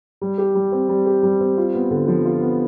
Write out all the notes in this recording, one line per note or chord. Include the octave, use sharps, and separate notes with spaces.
G3
G4
G3
C4
G3
G4
G3
C4
F4
B3
D3
F3
F4
B3